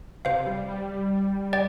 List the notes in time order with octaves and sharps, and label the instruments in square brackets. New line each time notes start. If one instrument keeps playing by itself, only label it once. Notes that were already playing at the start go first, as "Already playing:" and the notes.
[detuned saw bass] C3 [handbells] C5 F5
[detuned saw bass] G3
G3
[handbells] D5 G5